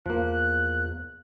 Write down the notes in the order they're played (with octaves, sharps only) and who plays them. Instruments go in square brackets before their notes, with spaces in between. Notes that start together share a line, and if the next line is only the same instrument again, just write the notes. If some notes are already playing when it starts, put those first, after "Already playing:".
[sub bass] E2 [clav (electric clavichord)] F3 A#3 [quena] F#6